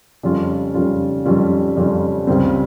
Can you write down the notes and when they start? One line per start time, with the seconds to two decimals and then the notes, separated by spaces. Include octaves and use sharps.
0.23 F2 C#3 G3 C#4 F4
0.74 F2 C#3 G3 C#4 F4
1.25 F2 C#3 G3 C#4 F4
1.77 F2 C#3 G3 C#4 F4
2.27 C#2 C#3 G3 C4